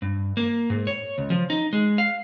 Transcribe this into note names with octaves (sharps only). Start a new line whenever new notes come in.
G2
A#3
G#2
C#5
C#2
F3
D#4
G#3
F5